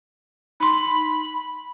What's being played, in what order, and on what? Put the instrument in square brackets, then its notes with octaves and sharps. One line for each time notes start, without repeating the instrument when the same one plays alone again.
[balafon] D#4 C6 [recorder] B5